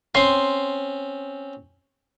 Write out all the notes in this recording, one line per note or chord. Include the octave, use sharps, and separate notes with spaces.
C4 C#4 C6